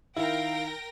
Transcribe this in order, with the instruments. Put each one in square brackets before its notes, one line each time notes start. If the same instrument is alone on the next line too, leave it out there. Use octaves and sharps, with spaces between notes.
[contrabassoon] D#3 [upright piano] E4 [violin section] A#4 G5 A#6 [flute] F5